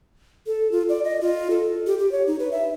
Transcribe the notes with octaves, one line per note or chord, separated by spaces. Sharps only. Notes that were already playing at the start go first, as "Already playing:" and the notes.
A4
F4
D5
D#5
F4
A4
G4
G4
C#5
D#4
B4
E5